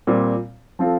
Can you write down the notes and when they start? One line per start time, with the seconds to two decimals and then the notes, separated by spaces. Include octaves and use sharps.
0.07 A#2 G3 C4
0.79 F3 C4 F4 A4